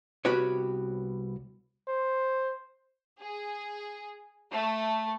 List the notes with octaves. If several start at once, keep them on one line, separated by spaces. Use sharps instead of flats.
C2 B3 F#4 G4 B4 C#5
C5
G#4
A3